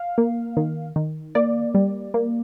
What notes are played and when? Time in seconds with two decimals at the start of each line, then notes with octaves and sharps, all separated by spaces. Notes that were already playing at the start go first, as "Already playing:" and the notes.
Already playing: F5
0.18 A#3
0.57 D#3
0.96 D#3
1.35 A#3 D5
1.75 G3
2.14 A#3